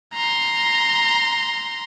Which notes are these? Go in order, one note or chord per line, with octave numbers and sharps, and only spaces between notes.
A#5 C6